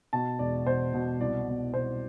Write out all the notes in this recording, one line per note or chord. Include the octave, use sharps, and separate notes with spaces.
B2 A5
E1 D5
B2 C5
B2
C2 D5
B2
B2 C5